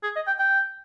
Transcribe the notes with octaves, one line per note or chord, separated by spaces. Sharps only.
G#4
D#5
G5
G5